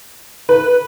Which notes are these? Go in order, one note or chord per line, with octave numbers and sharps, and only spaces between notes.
B4